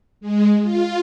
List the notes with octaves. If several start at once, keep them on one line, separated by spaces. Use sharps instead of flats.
G#3
F4